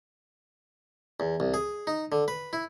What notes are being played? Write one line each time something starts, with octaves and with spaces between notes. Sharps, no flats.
E2
C2
G#4
D#4
D3
B4
E4